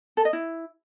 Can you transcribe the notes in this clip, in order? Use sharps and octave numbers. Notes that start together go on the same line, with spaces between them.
A4
D#5
E4